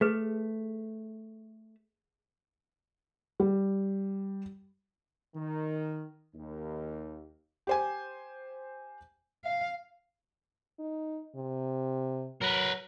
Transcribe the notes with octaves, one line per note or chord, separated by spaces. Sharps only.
A3 G#4 B4
G3
D#3
D#2
G4 C5 G#5
F5
D#4
C3
F#3 A#4 B4